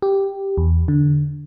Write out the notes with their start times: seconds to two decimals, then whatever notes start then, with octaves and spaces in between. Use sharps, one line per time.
0.02 G4
0.58 E2
0.88 D3